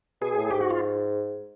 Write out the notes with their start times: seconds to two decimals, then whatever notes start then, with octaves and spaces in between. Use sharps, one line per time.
0.22 B2 G#4
0.36 A2
0.51 G#2 G4
0.61 F#4
0.70 F4